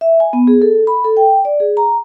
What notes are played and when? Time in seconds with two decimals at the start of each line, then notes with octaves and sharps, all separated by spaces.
0.01 E5
0.20 G#5
0.33 B3
0.47 G#4
0.62 A4
0.87 B5
1.04 A4
1.17 G5
1.45 D5
1.60 G#4
1.77 A#5